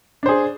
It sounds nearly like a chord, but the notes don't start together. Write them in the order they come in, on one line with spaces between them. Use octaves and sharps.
D4 C5 G#4